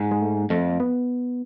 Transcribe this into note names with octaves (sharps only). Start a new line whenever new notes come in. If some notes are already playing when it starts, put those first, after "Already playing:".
Already playing: G#2
G#3
A3
F2 A3
B3